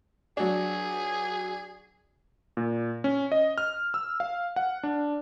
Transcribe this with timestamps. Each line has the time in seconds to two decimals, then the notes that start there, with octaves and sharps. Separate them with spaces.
0.37 F#3 D4 G#4
2.57 A#2
3.04 C#4
3.32 D#5
3.58 F6
3.94 E6
4.20 F5
4.56 F#5
4.83 D4